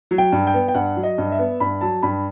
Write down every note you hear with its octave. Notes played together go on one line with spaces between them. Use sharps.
F#3
G5
G2
G5
B3
G5
G2 F#5
F#3
D#5
G2
E5
B3
G2 B5
F#3 A5
G2 B5